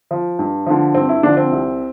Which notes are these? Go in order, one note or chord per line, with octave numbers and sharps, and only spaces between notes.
F3
G2
D3 F3
G2 C4
E4
D3 F3 D4
C4
C2